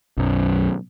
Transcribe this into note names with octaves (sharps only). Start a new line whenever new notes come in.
B1 F#2